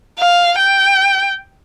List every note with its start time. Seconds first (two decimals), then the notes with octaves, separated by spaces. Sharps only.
0.20 F5
0.58 G5